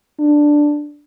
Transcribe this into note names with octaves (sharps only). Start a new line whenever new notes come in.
D4